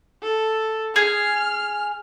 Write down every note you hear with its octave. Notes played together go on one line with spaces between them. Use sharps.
A4
G#4 F6